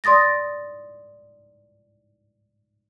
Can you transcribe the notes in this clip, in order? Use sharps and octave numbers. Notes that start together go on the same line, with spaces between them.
D5 C6 D#6 A6 A#6